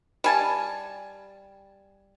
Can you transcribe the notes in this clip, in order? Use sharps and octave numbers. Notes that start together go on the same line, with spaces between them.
G3 G#5 A5